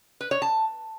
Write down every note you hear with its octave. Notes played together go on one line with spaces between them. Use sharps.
B4
C#5
A5